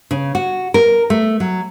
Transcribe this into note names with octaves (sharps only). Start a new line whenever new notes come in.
C#3
F#4
A#4
A3
F#3